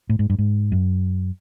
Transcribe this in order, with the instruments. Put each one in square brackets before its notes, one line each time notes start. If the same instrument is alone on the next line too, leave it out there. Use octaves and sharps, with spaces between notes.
[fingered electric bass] A2
G#2
G2
G#2
F#2